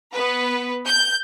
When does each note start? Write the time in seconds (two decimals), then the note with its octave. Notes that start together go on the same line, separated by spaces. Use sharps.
0.13 B3 B4
0.86 G6